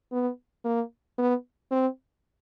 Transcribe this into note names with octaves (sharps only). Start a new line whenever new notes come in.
B3
A#3
B3
C4